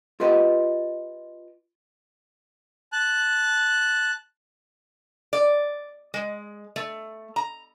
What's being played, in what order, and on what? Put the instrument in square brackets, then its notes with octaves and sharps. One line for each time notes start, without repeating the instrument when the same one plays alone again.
[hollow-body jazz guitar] F4 G4 B4 D#5
[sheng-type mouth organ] A5 F#6
[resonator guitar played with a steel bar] D5
G#3
A3
A#5